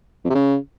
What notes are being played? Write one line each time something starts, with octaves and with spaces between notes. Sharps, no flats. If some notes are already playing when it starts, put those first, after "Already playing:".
F2
C3
C#3